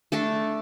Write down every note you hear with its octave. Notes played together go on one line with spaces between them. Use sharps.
A3 D4 A4